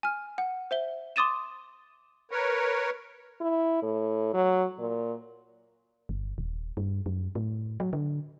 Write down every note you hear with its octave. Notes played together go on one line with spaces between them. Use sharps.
G#5 F6
F#5
C5 E5 G7
C6 D6 D#6 A6 D#7 E7
A#4 B4 C#5
E4
A2
F#3
A#2
G1
D#1
G2
F#2
A2
F#3
D3